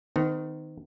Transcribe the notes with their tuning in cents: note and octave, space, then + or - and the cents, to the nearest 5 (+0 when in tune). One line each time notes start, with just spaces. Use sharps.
D#3 +0 C4 -45